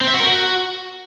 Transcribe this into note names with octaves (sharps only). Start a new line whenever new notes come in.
C4
E5
F#4
A#4
F#4